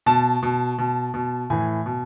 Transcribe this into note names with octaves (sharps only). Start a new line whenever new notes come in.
B2 A5
B2
B2
B2
A2 E3 G#5
B2